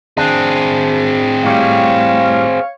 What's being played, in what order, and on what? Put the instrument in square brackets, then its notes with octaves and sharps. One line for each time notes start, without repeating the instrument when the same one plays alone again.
[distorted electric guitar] C4 G#4 [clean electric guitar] D4
[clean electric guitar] A2 G3 [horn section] C#5 F5